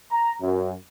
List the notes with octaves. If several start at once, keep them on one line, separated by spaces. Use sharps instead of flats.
A#5
F#2